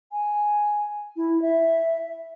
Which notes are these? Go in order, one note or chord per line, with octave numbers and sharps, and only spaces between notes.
G#5
E4
E5